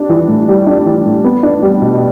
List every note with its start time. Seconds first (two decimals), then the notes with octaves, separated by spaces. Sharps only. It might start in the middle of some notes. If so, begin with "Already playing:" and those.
Already playing: G3 D4
0.09 E3
0.28 A2
0.48 G3
0.67 D4
0.86 E3
1.06 A2
1.24 B3
1.43 D4
1.62 G3
1.82 B2